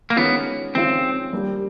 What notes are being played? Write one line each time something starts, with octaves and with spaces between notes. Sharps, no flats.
A#3
D#3 G#3 B3 C#4 F4
D#3 G#3 C4 C#4 F4
G3 A#3 D4 G4 A#4